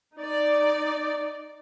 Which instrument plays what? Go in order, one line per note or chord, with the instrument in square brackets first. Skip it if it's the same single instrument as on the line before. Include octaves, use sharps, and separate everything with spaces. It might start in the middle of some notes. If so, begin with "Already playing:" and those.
[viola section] D#4 D5